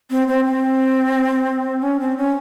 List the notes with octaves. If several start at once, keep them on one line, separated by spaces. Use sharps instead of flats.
C4
C4
C4
C#4
C4
C#4